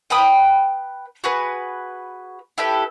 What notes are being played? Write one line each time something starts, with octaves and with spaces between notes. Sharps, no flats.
B4 G5 B5 D#6
F#4 G#4 B4
E4 G4 A4 B4